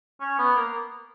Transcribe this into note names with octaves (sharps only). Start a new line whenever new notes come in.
C#4
B3
A#3